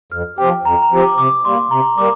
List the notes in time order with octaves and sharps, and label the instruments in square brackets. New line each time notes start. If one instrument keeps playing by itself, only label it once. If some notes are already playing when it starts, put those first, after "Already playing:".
[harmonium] F2 [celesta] F6
[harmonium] F3 C4 G4 [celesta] G5
[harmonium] F2 [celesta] A#5
[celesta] A#5
[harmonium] F3 C4 G4
[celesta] D6
[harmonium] C3 [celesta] D6
[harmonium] G3 A#3 [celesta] C6
[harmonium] C3 [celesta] A#5
[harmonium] G3 A#3 [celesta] D6